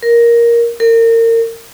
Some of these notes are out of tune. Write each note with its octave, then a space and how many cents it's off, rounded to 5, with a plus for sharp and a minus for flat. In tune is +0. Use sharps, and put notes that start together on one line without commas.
A#4 +10
A#4 -30